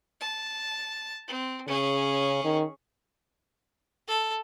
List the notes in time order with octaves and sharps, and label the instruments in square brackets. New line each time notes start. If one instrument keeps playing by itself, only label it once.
[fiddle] A5
C4
[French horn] C#3 [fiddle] C#4 G#4
[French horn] D#3
[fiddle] A4